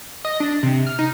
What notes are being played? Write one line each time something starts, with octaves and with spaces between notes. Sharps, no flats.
D#5
D4
C3
F6
D#4